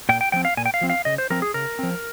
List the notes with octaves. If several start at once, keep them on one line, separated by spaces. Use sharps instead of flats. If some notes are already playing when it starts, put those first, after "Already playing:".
A#2 G5
G5
F3 C4 G5
F5
A#2 G#5
G5
F5
F3 C4
F5
C#3 D#5
C5
F3 C4 A#4
G#4
C#3 A#4
F3 C4